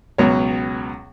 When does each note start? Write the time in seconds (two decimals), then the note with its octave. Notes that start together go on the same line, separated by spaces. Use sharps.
0.18 C#2 B2 F#3 C#5